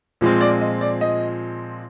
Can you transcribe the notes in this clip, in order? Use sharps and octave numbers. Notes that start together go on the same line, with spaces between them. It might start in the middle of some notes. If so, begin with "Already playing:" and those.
A#2 F3 G#3 C4
D5
D#5
D5
D#5